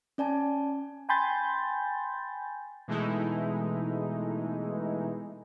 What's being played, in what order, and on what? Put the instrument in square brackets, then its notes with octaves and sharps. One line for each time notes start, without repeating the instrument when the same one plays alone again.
[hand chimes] C#4 D5 G#5 A5
[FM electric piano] G5 G#5 B5 C6 G6 A6
[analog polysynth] B2 E3 G#3 A3 D#4 E4